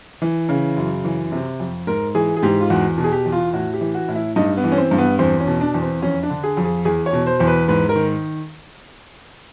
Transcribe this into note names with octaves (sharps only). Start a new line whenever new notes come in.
E3
C#3
F#2
E3
C3
F2
G#2 A#4
E3 G#4
G#4
G#2 G4
F4
E2 F#4
B2
G#4
G4
E2
F4
A2 F#4
G4
E3
F#4
A2
E4
G2 D#4
B3
E3
C#4
C4
G2
B3
E2 C4
C#4
B2
D4
E2
C4
F2 C#4
D4
D3
G#4
F2
G#4
E2 G#4
C#5
B2
C5
E2 C5
B4
G#2 B4
A#4
D#3